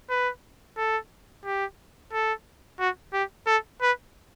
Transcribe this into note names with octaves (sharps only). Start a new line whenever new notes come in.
B4
A4
G4
A4
F#4
G4
A4
B4